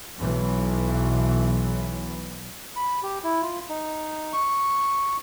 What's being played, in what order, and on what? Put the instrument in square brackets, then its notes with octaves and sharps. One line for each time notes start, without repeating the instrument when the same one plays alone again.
[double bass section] B1 B2 E3 F#3
[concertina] B5
G4
E4
F4
D#4
C#6